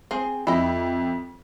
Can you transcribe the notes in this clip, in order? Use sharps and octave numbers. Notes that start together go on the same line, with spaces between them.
C4 G#4
F2 E4 D#5